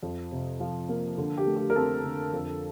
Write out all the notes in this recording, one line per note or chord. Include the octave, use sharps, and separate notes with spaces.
F2
C3
F3
A#3
D3
G4
A3
G4
A#4
C4 A4
D3
F2